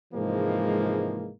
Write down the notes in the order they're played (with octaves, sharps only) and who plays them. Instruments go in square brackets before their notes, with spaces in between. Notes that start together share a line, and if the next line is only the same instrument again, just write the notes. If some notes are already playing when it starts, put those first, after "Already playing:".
[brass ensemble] G#2 C3 E3 F3 G#3 A#3